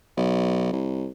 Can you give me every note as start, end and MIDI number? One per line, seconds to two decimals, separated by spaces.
0.17 0.69 35
0.72 1.08 36